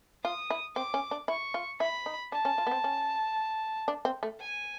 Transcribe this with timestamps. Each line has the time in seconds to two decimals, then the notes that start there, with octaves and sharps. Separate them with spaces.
0.24 F4 D#6
0.50 E4
0.76 C4 D6
0.94 C#4
1.11 D4
1.28 E4 C#6
1.54 F4
1.80 E4 B5
2.06 D#4
2.32 D4 A5
2.45 C#4
2.58 F4
2.67 B3
2.71 C4
2.84 C#4
3.88 D4
4.05 C4
4.23 A3
4.40 G#5